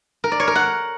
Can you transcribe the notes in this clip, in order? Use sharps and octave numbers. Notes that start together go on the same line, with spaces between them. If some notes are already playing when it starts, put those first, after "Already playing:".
A#4
D5
C#5
A#4
F#5